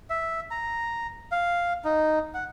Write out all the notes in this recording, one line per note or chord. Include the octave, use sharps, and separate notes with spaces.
E5
A#5
F5
D#4
F#5